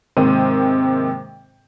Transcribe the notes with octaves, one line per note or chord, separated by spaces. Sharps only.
G#2 C3 D#3 A#3 C5 D#7